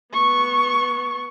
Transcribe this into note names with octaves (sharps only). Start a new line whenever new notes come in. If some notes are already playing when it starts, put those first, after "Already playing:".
B3 C#6